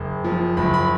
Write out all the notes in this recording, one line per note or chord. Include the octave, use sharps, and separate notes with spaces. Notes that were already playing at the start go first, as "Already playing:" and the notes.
Already playing: F#1
F3
F#1 B5
B5